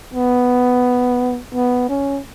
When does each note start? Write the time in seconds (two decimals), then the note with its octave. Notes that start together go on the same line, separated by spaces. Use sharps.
0.14 B3
1.55 B3
1.89 C#4